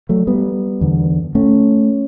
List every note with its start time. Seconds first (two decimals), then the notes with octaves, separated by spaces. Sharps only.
0.09 F#3 A3
0.27 G3 B3
0.81 E2 D3
1.35 A3 C#4